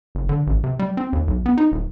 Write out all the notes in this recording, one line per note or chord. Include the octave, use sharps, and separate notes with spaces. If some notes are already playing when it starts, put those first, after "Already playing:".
F#1
D3
A1
C3
G3
C4
D#2
B1
B3
D#4
D#1